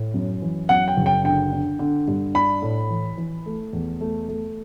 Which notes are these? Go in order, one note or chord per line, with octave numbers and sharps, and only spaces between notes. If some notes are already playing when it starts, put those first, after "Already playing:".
Already playing: A2
F#2
E3
F#2 F#5
G5
F#1
G5
D3 G5
D3
D3
G2
D4 B5
A2
E3
E3
A3
E2
A3
A3